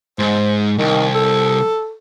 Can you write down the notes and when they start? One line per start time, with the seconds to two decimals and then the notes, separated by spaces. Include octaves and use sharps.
0.19 G#2 C5
0.79 C2 D#3
1.14 A4